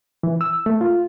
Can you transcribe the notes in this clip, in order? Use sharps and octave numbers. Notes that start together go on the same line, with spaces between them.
E3
E6
A3
F4